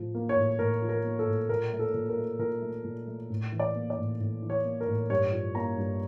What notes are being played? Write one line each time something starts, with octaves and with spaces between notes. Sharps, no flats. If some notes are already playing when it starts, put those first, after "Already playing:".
Already playing: A2 F3
A#3
C#5
A2
A2 A#4
F3
A#4
A#3
A4
A2
A#2 A#4
A3
A4
A#2
A#4
A3
A#2 A#4
A3
A#2
A3
A2
E3
D5
A#3
D5
A2
A2
E3
C#5
A#3
A#4
A2
G2 C#5
F3
A#3 A#5
G2